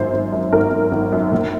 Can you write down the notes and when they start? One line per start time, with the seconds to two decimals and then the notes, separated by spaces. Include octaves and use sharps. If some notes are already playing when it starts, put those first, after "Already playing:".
Already playing: G#1 F#2 C5
0.13 G#1
0.32 F#2
0.52 G#1 A#4
0.72 G#1
0.92 G#1
1.12 F#2
1.31 A#1